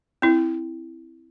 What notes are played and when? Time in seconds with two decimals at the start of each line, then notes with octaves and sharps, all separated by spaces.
0.22 C4 E4